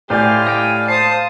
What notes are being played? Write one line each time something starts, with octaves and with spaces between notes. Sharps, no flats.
A2 G4 C5 D5 F5 G#5 G6
D#5 G5 G#5
C5 F5 A5 D#6